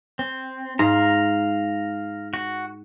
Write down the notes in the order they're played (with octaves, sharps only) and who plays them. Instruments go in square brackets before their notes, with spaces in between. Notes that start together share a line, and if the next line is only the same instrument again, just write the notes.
[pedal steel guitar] C4
[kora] G#2 [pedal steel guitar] F5 A#5
[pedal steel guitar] F#4